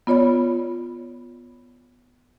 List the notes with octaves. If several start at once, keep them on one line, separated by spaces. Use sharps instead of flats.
B3 F4 C#5 D5 B5